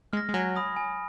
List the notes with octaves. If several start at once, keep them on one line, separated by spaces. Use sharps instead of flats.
G#3 F6 A#6
G#3
F#3 G#5
B5 D#6 A#6
G#5